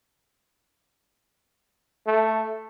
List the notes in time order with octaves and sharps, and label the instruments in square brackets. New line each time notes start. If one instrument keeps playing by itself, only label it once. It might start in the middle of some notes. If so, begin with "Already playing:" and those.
[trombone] A3